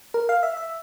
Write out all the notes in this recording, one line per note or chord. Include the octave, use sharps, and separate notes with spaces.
A#4
F5
E5
E5